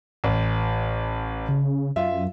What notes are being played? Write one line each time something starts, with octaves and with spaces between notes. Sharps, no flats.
A1
C#3
F#2 F4 E5